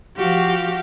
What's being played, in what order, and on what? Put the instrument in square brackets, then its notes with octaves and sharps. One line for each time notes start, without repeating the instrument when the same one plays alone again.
[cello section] F3 F#4 [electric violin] G4 F5